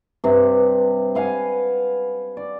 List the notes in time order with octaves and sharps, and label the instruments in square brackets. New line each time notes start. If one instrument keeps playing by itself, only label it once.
[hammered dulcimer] G2 C3
B4 F5 F#5 G#5
D5